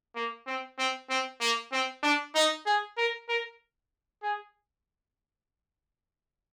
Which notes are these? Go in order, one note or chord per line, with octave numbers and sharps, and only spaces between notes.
A#3
C4
C4
C4
A#3
C4
D4
D#4
G#4
A#4
A#4
G#4